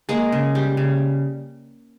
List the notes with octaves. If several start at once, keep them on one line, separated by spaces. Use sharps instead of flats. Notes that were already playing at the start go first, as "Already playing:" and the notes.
G#3 A#3 G#4
C#3
G3
C#3